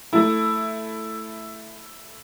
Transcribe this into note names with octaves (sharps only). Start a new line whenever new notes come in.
A3 E4